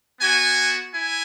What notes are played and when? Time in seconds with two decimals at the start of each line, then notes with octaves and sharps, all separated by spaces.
0.20 B3 F#4 G#5
0.94 E4 G#5